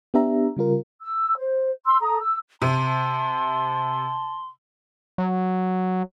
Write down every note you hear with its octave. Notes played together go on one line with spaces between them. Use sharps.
B3 D4 G4 E5 A#5
C#3 G3 F4 A#4
E6
C5
C6 E6
A4 A#5 D#6
E6
C3 A5 C6
F#3